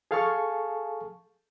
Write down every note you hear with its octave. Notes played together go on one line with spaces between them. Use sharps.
G#4 A4 F5 G#5 A5 C#6